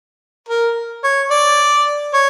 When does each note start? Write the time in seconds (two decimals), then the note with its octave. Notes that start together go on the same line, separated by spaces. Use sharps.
0.48 A#4
1.03 C#5
1.31 D5
2.14 C#5